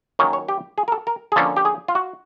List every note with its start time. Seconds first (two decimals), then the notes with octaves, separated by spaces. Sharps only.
0.19 D#3 F#3 A#3 C#4 C#5
0.33 C#5
0.49 G4
0.78 G#4
0.88 A#4
0.92 A4
1.07 A#4
1.32 G#4
1.36 D3 F3 A#3 C#4 A4
1.57 G4
1.65 G#4
1.88 F4
1.95 F#4